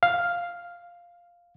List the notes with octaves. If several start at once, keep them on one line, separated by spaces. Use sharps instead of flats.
F5